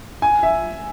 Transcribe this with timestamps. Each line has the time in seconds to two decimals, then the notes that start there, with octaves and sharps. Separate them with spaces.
0.22 G#5
0.43 E5